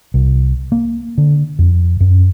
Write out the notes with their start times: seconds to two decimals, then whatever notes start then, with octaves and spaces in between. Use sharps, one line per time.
0.14 C2
0.72 A#3
1.18 D3
1.59 F2
2.00 F#2